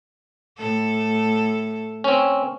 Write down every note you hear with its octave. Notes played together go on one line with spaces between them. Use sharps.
A2 A4
C4 C#4